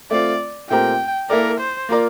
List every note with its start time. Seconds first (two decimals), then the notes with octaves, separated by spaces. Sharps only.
0.11 A3 C4 F4 D5
0.70 A#2 A3 C4 G4 A#4 G5
1.30 A#3 E4 A4 A#4 D5
1.60 C5
1.89 A#3 F4 A#4 D5